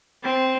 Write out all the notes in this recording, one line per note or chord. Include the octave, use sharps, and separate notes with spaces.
C4